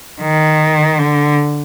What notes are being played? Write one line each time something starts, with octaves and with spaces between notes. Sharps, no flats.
D#3
D3